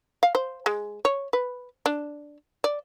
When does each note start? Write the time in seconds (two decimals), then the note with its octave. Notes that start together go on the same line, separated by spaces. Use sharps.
0.23 F5
0.35 C5
0.66 G#3
1.05 C#5
1.33 B4
1.86 D4
2.64 D5